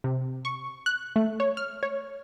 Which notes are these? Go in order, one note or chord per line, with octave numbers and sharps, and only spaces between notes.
C3
C#6
F#6
A3
C#5
F6
C#5